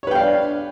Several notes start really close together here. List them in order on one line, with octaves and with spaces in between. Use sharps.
C#5 B4 G5 F5 D4